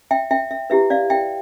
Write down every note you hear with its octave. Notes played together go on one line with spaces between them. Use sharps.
E5 G5
E5 G5
E5
E4 G4 B4 E5
D5 F5
E5 G5